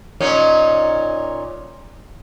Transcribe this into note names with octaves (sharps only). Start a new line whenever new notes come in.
A#2 C#4 D#4